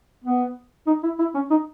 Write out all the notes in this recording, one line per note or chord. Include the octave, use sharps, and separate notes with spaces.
B3
D#4
E4
E4
C#4
D#4